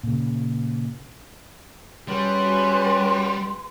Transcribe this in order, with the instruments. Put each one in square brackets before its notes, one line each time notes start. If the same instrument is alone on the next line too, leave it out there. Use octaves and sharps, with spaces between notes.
[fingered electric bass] A#2 C#3
[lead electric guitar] G3 [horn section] C#4 F#4 [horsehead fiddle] G#4 B4 [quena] C6